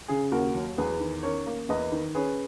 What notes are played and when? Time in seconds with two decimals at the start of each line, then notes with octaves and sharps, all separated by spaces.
0.08 C#3 G#4
0.32 D#2 F#4 A#4
0.55 F#3
0.78 E2 G#4 B4
1.00 D#3
1.23 C#4 A#4 C#5
1.46 A#3
1.69 E2 B4 D#5
1.92 D#3
2.15 C#4 G#4 B4